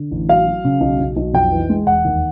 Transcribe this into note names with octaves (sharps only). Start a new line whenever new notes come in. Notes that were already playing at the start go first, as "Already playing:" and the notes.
Already playing: D3
A1
F#3 F5
F#3
C#3
B1
B1
B1
F2 G5
E3
G#3
E1 F#5
D#2